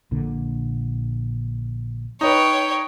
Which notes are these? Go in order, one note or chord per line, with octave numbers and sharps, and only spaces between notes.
A#1 A#2 D3
D#4 B4 C#5 G5